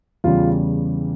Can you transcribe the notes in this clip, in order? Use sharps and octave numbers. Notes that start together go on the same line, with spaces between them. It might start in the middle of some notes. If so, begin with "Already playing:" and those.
E2 C#3 G3 F4